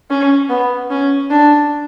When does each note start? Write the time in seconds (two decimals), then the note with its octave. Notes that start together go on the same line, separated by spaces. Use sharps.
0.10 C#4
0.49 B3
0.91 C#4
1.30 D4